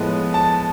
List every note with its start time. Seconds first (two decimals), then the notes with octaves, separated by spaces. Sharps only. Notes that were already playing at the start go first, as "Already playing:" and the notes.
Already playing: A2 F3 G#3 B3
0.34 A5